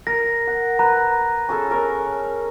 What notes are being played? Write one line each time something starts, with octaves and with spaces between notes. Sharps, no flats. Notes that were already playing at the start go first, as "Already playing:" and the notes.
A#4 A#6
F#5
B4 A#5
C#4 G#4 A4
A#4 C#5